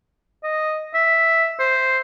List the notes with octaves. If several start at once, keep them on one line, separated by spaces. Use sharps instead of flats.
D#5
E5
C5